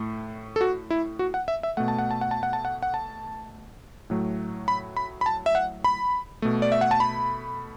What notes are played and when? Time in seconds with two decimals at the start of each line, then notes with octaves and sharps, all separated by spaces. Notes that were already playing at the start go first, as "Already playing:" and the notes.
Already playing: A2 A3
0.56 A4
0.61 F#4
0.90 E4
1.19 F#4
1.34 F#5
1.48 E5
1.63 E5
1.77 B2 A3 F#5
1.88 A5
1.98 F#5
2.11 A5
2.21 F#5
2.31 A5
2.43 F#5
2.53 A5
2.65 F#5
2.83 F#5
2.94 A5
4.10 A2 F#3 A3
4.68 B5
4.97 B5
5.21 B5
5.26 A5
5.46 E5
5.55 F#5
5.84 B5
6.42 B2 A3
6.62 D5
6.72 E5
6.81 F#5
6.91 A5
7.00 B5